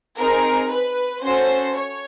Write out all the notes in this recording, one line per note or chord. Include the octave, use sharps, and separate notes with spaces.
C4 D#4 G#4 A#4
B4
C#4 F#4 A4 C5
C#5